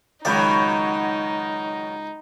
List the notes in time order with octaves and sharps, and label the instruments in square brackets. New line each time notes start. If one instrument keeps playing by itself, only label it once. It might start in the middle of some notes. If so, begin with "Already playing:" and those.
[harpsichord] C#2 D5 [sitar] D#3 F#3 [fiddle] D#4 [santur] F#5 G5 B5